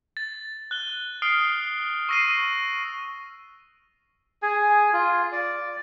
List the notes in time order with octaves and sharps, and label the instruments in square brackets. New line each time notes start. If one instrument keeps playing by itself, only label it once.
[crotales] A6
F#6 G7
D#6 F6 C7 D7 G7
C#6 E6 A#6 C7 D#7
[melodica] G#4 G#5
F4
D5